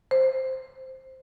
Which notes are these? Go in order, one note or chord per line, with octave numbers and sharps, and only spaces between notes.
C5